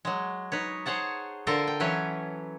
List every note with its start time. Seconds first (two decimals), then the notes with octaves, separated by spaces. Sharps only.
0.05 F#3 G#3
0.52 D#4 B4 C#5
0.86 G#4 C5 C#5 F#5 A5
1.47 D3 F4 A4 A#4 C5 F5
1.67 G5
1.80 E3 F#3 C#4 B4 C#5